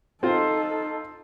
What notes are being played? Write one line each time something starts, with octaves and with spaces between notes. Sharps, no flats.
C4 D#4 F4 A4 C5